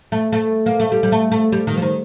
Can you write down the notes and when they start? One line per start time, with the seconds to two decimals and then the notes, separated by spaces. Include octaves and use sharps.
0.12 A3
0.32 A3
0.66 A#3
0.80 A3
0.92 G3
1.03 G3
1.12 A3
1.32 A3
1.52 G3
1.67 D#3
1.77 F3
1.82 D#3